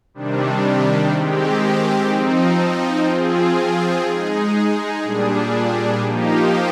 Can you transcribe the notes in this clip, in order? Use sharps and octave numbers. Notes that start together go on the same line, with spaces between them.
C3 D#3 G3 D4
D#3 G#3 C4 G4
F3 C4 D#4
F3 C4 F4 G#4
G#3 D#4 G#4
A#2 G3 D4 G#4
F3 A#3 D#4 G4